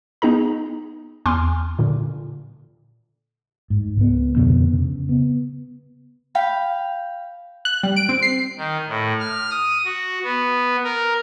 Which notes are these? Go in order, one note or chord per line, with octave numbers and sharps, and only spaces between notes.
B3 D#4 G#4 A#5
E2 G#5 C6 D6 F6
A#2 D3
G#2
C#2 B3
F2 B2 D3 B3
C#3
B3
F5 G5 B5
F#6
G3
D7
C4
C7
D#3
A2
F6
D#6
F#4
B3
A#4